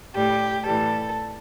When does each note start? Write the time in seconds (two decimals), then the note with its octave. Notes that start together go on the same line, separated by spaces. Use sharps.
0.15 A2 G3 G4
0.65 A2 E3 G3 A4